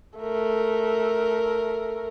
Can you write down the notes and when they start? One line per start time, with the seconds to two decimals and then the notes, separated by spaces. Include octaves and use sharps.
0.19 A3 A#4